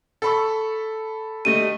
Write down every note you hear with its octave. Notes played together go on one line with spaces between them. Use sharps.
A4 B5 C#6
G3 A3 D#5 D#7